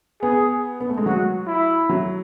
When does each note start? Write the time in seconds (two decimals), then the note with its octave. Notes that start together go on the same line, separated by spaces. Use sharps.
0.23 B3 G#4
0.80 B3
0.89 A3
0.98 G#3
1.06 F#3 F#4
1.47 E4
1.89 F#3